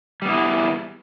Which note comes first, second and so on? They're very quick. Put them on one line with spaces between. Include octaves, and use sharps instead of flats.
G3 B3 E4 G#4